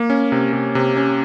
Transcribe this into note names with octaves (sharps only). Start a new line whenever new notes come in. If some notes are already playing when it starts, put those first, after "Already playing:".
Already playing: A#3
C#4
C3
C3
C3
C#4